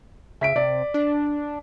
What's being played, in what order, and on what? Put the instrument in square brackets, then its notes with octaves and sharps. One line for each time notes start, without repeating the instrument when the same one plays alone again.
[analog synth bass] C#3 [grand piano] E5 B6 D7
[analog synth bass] C3 [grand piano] D5
[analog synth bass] D4